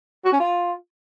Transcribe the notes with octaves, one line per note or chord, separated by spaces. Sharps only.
F#4
C#4
F4